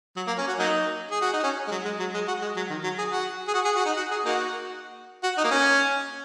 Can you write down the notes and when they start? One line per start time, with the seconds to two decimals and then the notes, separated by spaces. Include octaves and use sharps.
0.17 F#3
0.27 A#3
0.38 C#4
0.48 F#4
0.59 F#3 A#3 D#4
1.11 G#4
1.21 F#4
1.33 D#4
1.44 C#4
1.68 G#3
1.71 F#3
1.85 G#3
2.00 F#3
2.14 G#3
2.28 F#4
2.42 G#3
2.57 F#3
2.70 D#3
2.84 F#3
2.98 G#4
3.12 F#4
3.48 G#4
3.54 F#4
3.65 G#4
3.76 F#4
3.86 D#4
3.97 F#4
4.11 G#4
4.25 A#3 D#4 F#4
5.23 F#4
5.38 D#4
5.44 A#3
5.51 C#4